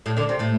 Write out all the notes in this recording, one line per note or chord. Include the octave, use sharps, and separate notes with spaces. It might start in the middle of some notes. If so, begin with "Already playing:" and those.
A2 A3
D3 D4
C3 C4
A2 A3